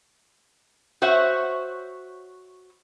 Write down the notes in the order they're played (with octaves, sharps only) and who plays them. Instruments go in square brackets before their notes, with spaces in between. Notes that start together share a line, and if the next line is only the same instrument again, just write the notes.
[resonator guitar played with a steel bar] F#4 C5 C#5 E5 F#5